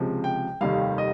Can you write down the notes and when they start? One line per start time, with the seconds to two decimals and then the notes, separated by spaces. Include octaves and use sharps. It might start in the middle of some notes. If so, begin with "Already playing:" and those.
Already playing: C#2 C3 F3 G#3
0.24 G5
0.61 F1 D#2 D#3 G3 F5
0.98 D#5